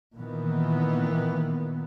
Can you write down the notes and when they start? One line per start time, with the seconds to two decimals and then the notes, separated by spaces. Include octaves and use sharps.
0.15 A#2 D#3 E3 B3